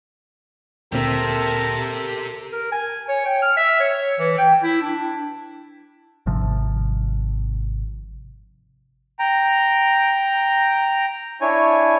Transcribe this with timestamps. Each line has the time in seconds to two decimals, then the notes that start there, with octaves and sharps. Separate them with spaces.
0.92 D2 A#2 C4 G4 A4 A#4 E5
2.52 A#4
2.72 G#5
3.08 C#5
3.25 G5
3.42 F6
3.57 E5
3.80 C#5
4.19 E3
4.38 G5
4.63 E4
4.82 D4
6.26 G#1 C3 F3
9.19 G5 A#5
11.41 D4 E4 C#5 G#5